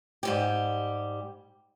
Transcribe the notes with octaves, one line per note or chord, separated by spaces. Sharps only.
G#2 G3 G4